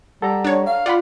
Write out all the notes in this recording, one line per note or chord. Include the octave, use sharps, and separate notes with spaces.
G3 A4 F#5 A#5
D4 C#5
F5
F4 D5 F#5 B5